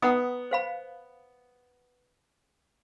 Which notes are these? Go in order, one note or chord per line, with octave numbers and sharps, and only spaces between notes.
B3 F#5 A#5 D#6
C5 F5 B5